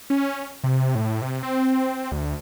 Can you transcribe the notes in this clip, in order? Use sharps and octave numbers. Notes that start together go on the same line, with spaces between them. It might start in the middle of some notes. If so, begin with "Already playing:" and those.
C#4
C3
A2
C3
C4
D2